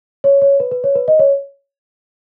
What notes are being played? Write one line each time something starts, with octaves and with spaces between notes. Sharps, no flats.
C#5
C#5
B4
B4
C#5
B4
D#5
C#5